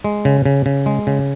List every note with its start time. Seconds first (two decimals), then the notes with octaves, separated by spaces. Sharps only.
0.04 G#3
0.25 C#3
0.46 C#3
0.66 C#3
0.86 G#3
1.07 C#3